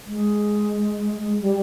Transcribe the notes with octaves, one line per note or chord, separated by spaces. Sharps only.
G#3
G#3
G3